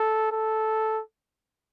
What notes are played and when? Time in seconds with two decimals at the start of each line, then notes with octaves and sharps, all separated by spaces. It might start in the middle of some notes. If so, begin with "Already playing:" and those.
Already playing: A4
0.32 A4